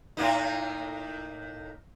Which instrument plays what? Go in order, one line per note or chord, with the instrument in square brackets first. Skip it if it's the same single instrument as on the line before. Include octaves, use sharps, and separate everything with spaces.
[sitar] A2 A#3 D#4